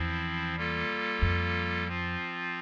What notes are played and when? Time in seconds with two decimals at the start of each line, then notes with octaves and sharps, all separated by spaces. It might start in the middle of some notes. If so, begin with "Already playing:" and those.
Already playing: E2 F3 C4 E4
0.56 G3 A#3 F4 A4
1.22 F2
1.87 F3 C4 F4